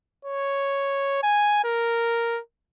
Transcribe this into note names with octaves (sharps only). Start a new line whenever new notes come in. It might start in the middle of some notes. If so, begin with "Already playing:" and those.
C#5
G#5
A#4